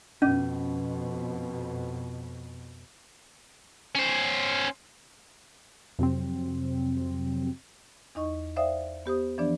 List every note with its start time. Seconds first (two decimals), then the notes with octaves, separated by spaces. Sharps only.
0.22 F2 B2 C#4
3.95 C#4 C5
5.99 F2 C3 F#3 C4
8.15 E2 D#4 D#5 C#6
8.56 C5 D5 E5 F5 G5 D#6
9.06 B3 G4 C5 D#6
9.38 E3 F3 B3 D4 D5